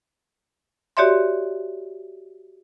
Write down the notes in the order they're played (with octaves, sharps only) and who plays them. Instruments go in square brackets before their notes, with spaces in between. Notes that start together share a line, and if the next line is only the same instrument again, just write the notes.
[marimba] F#4 G4 C#5 D5 E5 C6